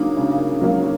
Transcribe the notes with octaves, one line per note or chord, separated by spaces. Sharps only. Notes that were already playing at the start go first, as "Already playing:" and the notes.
Already playing: C#3 F#3 A#3 D4 D#4
C#3
F#3 A#3